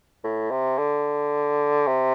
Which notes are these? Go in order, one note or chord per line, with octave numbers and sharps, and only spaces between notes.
A2
C3
D3
C3